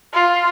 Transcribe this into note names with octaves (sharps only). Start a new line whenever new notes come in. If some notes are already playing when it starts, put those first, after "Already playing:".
F4